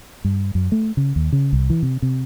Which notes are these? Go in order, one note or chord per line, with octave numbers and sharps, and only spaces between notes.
G2
F#2
A3
C#3
D#2
C#3
C2
E3
C3
C3